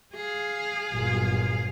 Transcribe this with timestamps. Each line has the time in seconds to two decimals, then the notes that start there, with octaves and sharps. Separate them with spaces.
0.14 G#4 F5
0.90 G1 A#2 F#3